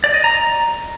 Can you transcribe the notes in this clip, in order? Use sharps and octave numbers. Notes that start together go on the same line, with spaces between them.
D5
D#5
A#5